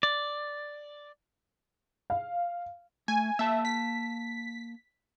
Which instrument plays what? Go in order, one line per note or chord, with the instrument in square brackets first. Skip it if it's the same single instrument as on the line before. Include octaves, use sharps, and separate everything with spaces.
[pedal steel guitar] D5
[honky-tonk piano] F5
[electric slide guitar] A3 [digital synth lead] G#5
[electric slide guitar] A#3 A5 [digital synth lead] E5
[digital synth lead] B6